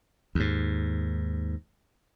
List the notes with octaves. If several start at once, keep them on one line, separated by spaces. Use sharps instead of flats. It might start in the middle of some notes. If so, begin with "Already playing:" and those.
D#2 G#2